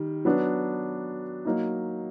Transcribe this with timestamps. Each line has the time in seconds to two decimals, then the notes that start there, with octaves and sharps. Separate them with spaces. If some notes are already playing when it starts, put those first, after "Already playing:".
Already playing: D#3 G3
0.25 F#3 B3 D4
1.45 F#3 A#3 D#4